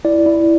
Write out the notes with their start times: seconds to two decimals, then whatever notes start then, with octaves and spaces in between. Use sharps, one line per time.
0.05 E4 D5
0.26 E4